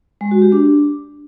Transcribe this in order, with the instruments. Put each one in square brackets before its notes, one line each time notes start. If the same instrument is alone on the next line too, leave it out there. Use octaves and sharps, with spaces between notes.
[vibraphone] G#3
F#4
G4
D4